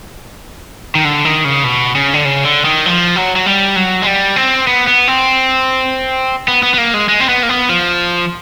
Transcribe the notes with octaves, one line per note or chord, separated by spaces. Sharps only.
D#3
D3
D#3
C#3
B2
C#3
D3
C#3
D3
D#3
F3
F#3
F#3
G3
F#3
G#3
G3
C4
B3
B3
C4
B3
B3
B3
A#3
G#3
G#3
C4
B3
A#3
B3
F3